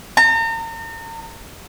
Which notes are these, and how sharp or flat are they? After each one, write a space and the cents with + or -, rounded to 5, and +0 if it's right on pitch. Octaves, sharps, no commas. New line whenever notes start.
A#5 -40